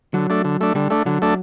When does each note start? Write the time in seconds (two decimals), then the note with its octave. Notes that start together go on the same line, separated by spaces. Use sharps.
0.14 D3 F#3
0.30 A3 D4
0.45 D3
0.61 A3 D4
0.75 D3 G3
0.90 A3 D4
1.06 D3 F#3
1.22 A3 D4